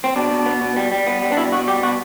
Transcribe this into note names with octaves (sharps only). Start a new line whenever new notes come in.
C4
B2 D4
B2
B3
B2
G3
G3
B3
G3
D4
B2 E4
B2 F#4
G3 G4
B2 F#4